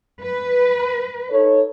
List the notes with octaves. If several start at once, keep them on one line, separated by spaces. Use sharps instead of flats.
B4
D#4 A4 C#5